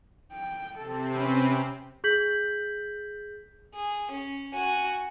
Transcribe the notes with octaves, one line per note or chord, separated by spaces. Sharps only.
G5
C3 C4 A4
C#4 B4
G#4 G6 B6 F#7
G#4
C#4
F#4 G#5